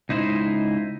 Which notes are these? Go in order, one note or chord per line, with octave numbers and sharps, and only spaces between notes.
C#2 D#4 E4 C5